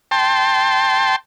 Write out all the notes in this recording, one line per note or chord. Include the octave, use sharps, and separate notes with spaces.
G5 A5 C6